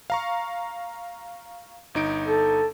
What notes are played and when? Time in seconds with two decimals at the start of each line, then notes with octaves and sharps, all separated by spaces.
0.10 F5 A#5 C#6
1.95 G1 D#4 D7
2.27 A4